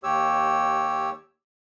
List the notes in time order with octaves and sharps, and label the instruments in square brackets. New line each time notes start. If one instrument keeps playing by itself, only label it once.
[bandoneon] D#2 G4 C#5 E6